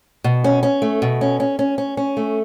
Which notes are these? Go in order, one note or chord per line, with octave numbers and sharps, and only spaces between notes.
B2
C#4
C#4
A3
B2
C#4
C#4
C#4
C#4
C#4
A3